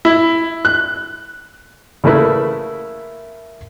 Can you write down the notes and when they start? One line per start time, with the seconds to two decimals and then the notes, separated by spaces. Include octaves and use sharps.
0.05 E4
0.65 F#6
2.04 C#3 A3 A#3 E4 B4